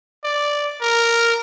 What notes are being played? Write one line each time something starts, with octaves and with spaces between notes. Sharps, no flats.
D5
A#4